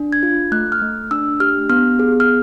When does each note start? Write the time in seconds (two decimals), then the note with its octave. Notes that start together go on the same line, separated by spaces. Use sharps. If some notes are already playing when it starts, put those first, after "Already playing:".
Already playing: D4
0.12 G#6
0.23 F4
0.52 A3 F#6
0.72 F6
0.82 A3
1.11 D4 E6
1.40 G4 F6
1.69 B3 F6
1.99 G#4
2.20 F6